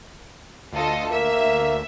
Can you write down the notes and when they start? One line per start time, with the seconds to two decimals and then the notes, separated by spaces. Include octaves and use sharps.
0.72 D2 F4 A4 D#5
1.11 A#3 E5